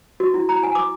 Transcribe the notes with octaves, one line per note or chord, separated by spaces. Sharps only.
F#4
E4
A#5
G#5
D6